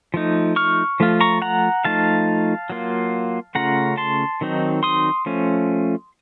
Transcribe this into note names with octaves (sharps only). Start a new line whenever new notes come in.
F3 A3 D#4
C#6 F6
F3 A3 F4
A#5 C#6
F#5 A#5
F3 A3 D#4 F5 A5
F#3 A#3 F4
C#3 A3 C#4 F4 F#5 A#5
A5 C6
D#3 F#3 C4 D#4
C6 D#6
F3 A3 C#4